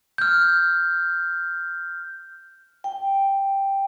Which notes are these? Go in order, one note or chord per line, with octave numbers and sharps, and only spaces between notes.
F6 G6
G5